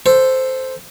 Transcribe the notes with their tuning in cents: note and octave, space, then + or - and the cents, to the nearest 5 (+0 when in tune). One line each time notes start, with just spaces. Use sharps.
A4 +0 C5 -5